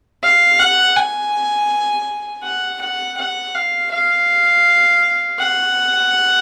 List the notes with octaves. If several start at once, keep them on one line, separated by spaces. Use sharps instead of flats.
F5
F#5
G#5
F#5
F#5
F#5
F5
F5
F#5